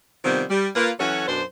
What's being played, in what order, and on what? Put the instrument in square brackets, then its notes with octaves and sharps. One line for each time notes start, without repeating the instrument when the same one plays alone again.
[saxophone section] C3 D#3 F3 G3 B3 C4
G3
A#3 F4 B4
E3 F#3 C#4 F#4 A4 C#5
F#2 B2 D4 C5